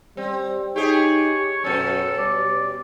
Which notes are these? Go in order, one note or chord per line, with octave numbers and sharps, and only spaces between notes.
G3 C4
D#4 G4 G#4 C#5
F#2 B2 C#4 A4
G3 D5